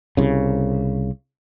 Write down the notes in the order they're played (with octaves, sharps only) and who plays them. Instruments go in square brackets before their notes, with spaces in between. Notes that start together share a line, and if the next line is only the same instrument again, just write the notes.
[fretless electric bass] C2 C#3